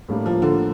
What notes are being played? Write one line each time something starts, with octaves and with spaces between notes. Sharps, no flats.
A2 G3 A#3 D4
F3
D3